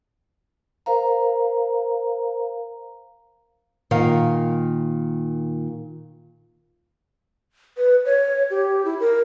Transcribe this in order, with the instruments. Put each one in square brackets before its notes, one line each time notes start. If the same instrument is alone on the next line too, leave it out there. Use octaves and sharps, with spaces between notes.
[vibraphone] A#4 C5 F5 A#5
[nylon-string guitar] A#2 D#3 A#4 F5
[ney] B4
C#5
G4
E4
A#4